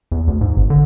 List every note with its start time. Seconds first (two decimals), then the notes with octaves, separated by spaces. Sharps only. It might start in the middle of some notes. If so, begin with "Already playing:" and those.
0.12 E2
0.27 D2
0.41 G#2
0.56 G#1
0.70 D3